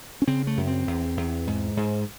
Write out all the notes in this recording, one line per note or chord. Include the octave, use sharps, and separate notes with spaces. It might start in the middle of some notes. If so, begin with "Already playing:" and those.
C#4
C#3 C4
A3
F#2
C4
E2
E2
G#2
G#2